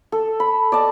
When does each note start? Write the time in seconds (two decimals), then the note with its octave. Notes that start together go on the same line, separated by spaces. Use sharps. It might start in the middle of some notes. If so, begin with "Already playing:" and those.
0.12 A4
0.40 B5
0.72 D5 D#5 A5